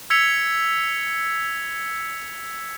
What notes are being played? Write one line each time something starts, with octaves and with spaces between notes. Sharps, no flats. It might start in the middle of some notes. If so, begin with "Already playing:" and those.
E6 G#6 B6 C#7 F7